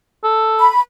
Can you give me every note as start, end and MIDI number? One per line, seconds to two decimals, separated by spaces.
0.24 0.68 69
0.60 0.79 83